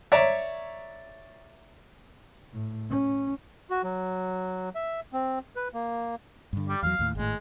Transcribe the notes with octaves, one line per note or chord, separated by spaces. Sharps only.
C#5 D5 E5 A#5
A2
C#4
F#4
F#3
E5
C4
B4
A#3
G2 D3
G3 D5
E2 F3 F#3 F5
D#2 A2
G#1 A2 G#3